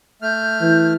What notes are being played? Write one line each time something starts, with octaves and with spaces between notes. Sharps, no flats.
A3 F6 G6
E3